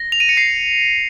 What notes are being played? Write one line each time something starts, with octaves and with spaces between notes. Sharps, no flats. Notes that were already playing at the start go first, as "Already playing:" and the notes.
Already playing: A#6
F7
D#7
C#7
C7